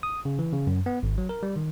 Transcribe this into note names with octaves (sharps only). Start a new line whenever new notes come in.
D#6
C#3
E3
C#3
F#2
B3
G#1
F#3
A#4
G3
D#3